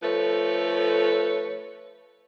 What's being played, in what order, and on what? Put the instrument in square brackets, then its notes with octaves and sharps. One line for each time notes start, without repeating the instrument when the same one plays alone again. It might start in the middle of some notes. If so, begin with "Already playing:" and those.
[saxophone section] F3 A3 A4 B4 C#5